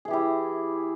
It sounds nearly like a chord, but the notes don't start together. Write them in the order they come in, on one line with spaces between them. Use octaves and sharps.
G#4 E3 G4 E4